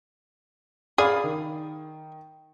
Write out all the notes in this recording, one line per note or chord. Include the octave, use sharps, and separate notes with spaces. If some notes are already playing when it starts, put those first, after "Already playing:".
G#4 D5 F5 B5
D#3